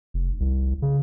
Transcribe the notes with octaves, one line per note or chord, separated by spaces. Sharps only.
F1
C2
C#3